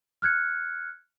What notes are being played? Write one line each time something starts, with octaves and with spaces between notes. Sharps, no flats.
F6 F#6 G#6 C#7